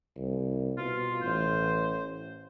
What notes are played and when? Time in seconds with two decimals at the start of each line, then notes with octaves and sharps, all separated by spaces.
0.17 C2
0.78 B2 F4
1.22 A1 C5